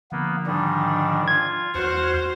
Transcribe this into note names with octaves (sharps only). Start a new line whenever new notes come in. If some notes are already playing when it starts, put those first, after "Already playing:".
D3 F3 A#3 B3
G#2 D#3 G3 D4
F4 G#6
E2 F#4 C5 F#5 C#6 F6